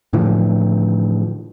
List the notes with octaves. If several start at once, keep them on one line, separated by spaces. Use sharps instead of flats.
A2 D3 E3 F3